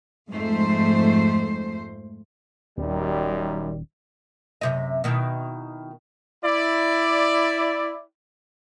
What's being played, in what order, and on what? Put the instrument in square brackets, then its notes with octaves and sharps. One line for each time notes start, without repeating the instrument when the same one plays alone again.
[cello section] F2 G#2 A3 C5
[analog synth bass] D#1 [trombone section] F#2 D#3 G3
[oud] F#2 C3 D#5
B2 D#3 E4
[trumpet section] E4 D5